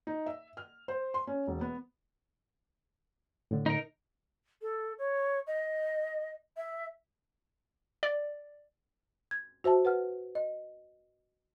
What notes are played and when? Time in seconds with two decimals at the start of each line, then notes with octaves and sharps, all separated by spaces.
0.07 D#4
0.26 E5
0.57 F6
0.88 C5
1.14 C6
1.27 C#4
1.47 E1
1.61 B3
3.51 A2 D3
3.66 D#4 A#4
4.62 A4
4.98 C#5
5.47 D#5
6.57 E5
8.03 D5
9.31 G#6
9.64 F#4 C5 E5 A5
9.85 B4 F#5 F6
10.35 D#5